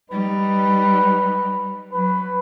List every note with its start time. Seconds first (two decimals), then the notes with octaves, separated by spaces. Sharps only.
0.11 G3 D#4 B4
1.93 F#3 B4